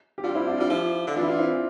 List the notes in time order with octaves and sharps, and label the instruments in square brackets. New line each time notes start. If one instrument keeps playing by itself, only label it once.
[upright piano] G4
[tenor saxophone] G3 [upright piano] D4 F4
[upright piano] C4 E4
D4 F4
[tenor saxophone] G3 [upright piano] D4 F4
[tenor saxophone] F3 [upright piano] E4 G4
[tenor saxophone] D3
[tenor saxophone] E3 [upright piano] D4 F4
[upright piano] E4
D4 F4
C4 E4